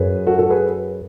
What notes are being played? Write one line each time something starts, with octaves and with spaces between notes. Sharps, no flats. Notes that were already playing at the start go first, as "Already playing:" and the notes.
Already playing: F#2 G#4 B4
F#4 A4
F#4 A4
G#4 B4